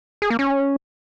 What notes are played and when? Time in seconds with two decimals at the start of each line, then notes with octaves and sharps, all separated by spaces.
0.22 G#4
0.30 A#3
0.39 C#4